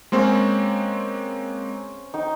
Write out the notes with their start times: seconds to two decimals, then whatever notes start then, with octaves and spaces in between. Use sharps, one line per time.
0.12 G#3 A#3 C4 C#4 C5
2.14 D#4 G5